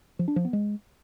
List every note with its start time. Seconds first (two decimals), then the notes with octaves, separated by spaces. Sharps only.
0.19 F3
0.28 D4
0.36 F3
0.45 B3
0.53 G#3